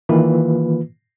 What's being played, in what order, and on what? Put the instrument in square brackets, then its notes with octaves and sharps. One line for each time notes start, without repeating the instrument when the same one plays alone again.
[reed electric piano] D#3 E3 A#3 F4 B4